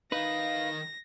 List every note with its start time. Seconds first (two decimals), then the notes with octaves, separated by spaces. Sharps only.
0.12 D#3 D#4 B4 F5 A#6